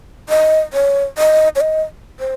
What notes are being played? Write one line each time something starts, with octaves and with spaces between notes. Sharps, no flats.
D#5
C#5
D#5
C#5
D#5
C5